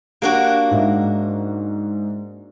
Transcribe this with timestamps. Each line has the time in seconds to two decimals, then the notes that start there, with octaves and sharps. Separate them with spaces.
0.22 A#3 D4 F#4 G4
0.71 G#2 E5